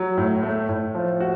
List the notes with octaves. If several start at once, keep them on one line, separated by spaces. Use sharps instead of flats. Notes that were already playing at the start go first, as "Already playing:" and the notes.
Already playing: F#3
A2
A3
A2
F3
F#4